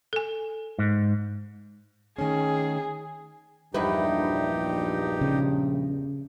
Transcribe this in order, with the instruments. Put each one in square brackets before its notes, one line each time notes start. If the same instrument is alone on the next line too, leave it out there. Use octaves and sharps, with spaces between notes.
[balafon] A4 G#5
[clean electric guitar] G#2
[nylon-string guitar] D#3 A3 C#4 [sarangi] G#4
[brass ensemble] A#1 G2 [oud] E2 E4 B4 [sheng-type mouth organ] D#4 G4
[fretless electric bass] C#3